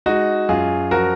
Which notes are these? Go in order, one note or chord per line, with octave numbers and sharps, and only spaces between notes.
G#3 D#4 F#4
F#2 F4 G#4
F3 F#4 A#4